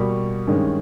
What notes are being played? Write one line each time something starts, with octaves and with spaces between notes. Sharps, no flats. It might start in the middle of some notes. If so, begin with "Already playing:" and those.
Already playing: B2 G3 A#3 B5 C#6
G2 D#3 G#3 C#4